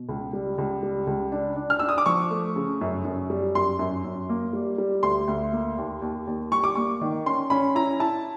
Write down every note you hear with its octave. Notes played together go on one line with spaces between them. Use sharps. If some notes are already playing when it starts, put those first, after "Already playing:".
Already playing: B2
C#2
G3
C#2
G3
C#2
D4
D4
F6
D4 E6
D#6
D6
F3 C#6
A3
C#3
F#2
F#2
G3
F#2 C6
F#2
F#2
A#3
G3
G3
D2 C6
D2
A#3
D#2
D#2
D#2
G3 C#6
D6
A#3 C#6
D#3
C#4 C6
C#4 B5
E4 A#5
E4 A5